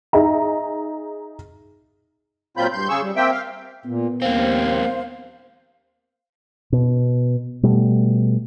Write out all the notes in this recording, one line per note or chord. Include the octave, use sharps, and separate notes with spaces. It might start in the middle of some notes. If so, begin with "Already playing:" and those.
D#4 G#4 E5 A#5
A#2 F#3 C4 F4 B5 G6
G2 C6 G6
C#3 G#4 C#6 E6
G3
A#3 C4 E5 G5
F5
A#2 B3
D#2 A#3 C4 C5 F5
B2
B2 G3 A3